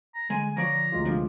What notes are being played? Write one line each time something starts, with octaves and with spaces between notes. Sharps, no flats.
A#5
D3 G#3 G#5
F3 C#5 D5 A#5
D2 G#3 F4
C3 F3 D4